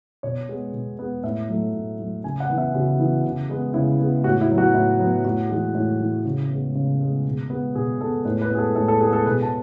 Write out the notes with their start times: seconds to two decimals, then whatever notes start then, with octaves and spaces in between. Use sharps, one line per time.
0.23 B2 C#5
0.49 G#3 B3
0.73 B2
0.99 G#3 B3
1.24 A2 E5
1.49 F#3 A3
1.74 A2
1.99 F#3 A3
2.24 C#3 G#5
2.40 F#5
2.49 E3 B3
2.58 E5
2.74 C#3 F#4
2.99 E3 B3
3.24 C#3
3.50 G#3 B3
3.74 C#3 E4
4.00 G#3 B3
4.24 A2 F#4
4.41 E4
4.49 F#3 B3
4.58 F#4
4.74 A2 E4
4.99 F#3 B3
5.25 A2 F#4
5.49 E3 G#3
5.75 A2
6.00 E3 G#3
6.25 C#3
6.50 G#3 B3
6.75 C#3
7.00 G#3 B3
7.25 B2
7.50 G#3 B3
7.75 B2 G#4
8.01 G#3 B3 A4
8.25 A2 B4
8.41 B4
8.50 G#3 B3 G#4
8.58 A4
8.75 A2 A4
8.88 A4
9.01 G#3 B3 G#4
9.13 A4
9.26 B2 B4
9.42 A5